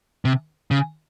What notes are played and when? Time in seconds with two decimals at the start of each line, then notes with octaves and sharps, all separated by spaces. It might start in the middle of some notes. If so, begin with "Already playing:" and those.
0.25 C3
0.71 C#3